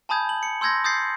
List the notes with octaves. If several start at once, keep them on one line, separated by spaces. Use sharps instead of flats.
G#5 A5 B5 D#6 G6 G#6
F#7
C#7
C6 E6 G6 G#6 A#6
D#6 G6 A6 C7